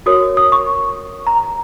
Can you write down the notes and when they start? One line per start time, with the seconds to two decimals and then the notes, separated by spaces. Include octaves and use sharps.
0.06 F#4 A#4 C#5 D#6
0.37 D#6
0.52 C#6
1.27 A#5